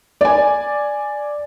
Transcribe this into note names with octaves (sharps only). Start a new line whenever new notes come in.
D5 G#5